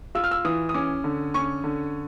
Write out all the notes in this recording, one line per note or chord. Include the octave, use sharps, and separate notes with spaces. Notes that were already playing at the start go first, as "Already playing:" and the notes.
F4 E6
F6
E6
E3 D#6
D#6
C#4 D6
D3
C#4 C#6
D3